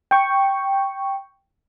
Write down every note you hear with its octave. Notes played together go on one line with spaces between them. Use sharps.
G5 C#6